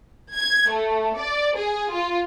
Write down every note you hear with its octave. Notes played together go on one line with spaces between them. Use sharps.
G#6
A3
D5
G#4
F4